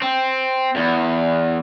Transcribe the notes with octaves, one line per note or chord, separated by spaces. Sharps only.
C4
E2